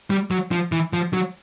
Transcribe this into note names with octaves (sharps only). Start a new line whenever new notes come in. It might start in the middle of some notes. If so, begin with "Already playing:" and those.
G3
F#3
F3
E3
F3
F#3